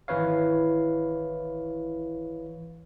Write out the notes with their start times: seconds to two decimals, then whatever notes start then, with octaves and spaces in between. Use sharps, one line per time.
0.08 G#1 E3 E4 B4 C#5 F5